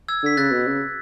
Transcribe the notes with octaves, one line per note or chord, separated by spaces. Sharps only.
E6 G#6
D3 B6
C#3 F#6 A6
B2
C#3